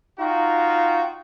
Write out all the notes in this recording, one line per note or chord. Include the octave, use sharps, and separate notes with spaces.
D#4 F4 F#4 G5